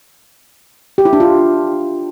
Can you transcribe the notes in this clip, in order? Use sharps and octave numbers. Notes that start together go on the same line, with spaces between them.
G4
E4
D4
F4